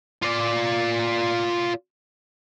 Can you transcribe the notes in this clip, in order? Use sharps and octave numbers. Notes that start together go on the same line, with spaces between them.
F4 D5